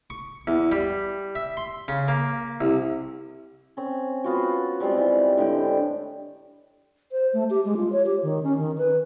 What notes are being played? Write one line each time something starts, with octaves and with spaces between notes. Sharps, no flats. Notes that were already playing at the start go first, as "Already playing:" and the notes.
C#6
E2
G3
E5
C6
C#3
A#3
C2
C4 C#4
B3 F4 F#4
F3 G3 G#3 C4
E3
A2 D3 G#3 G5
C5
A3
G4
G#3
F4
C#5
G4
D#3
C#4
D#3
B4